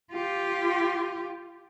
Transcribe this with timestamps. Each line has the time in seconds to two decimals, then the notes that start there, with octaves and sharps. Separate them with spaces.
0.12 F4 G4